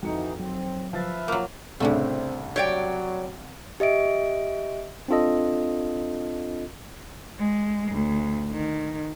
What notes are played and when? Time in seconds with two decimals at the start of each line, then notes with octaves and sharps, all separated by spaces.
0.03 F2 D#3 E3 D#4 F#4 C#7
0.39 F#3 C4
0.93 F3 B4 E5 F5 A6
1.28 F#3 A#3 F4
1.80 C2 A2 C#3 G3 A3 C4 D4
2.56 F#3 G4 C#5 D5 G5
3.80 G4 D#5 E5 D7
5.08 C4 D4 F4 A4 D#5
7.39 G#3
7.91 D2
8.52 D#3